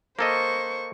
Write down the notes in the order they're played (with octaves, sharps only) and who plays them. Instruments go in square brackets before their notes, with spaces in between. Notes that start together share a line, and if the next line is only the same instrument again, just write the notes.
[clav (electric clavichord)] A#3 A4 D#5 [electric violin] C5 C#6